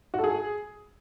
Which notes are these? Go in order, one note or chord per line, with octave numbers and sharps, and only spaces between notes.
F#4
A4
G#4